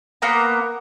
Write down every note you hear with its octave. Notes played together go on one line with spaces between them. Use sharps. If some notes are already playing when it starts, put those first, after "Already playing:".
A#3 B3 A#5